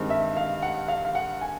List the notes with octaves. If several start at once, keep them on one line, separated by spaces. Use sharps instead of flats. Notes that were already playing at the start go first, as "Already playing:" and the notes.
Already playing: G2 D#3 G#3 C4
E5
F5
F#5
F5
F5
F#5
G#5